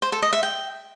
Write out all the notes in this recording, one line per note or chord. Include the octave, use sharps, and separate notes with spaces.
C5
A4
D#5
E5
G5